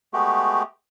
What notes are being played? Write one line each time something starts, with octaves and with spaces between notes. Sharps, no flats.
G#3 A3 B3 F#4 G4